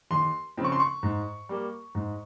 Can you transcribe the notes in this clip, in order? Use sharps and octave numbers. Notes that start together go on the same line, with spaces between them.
D#2 C6
C#3 F3 C4
C#6
C6
C#6
G#2
G3 A#3
G#2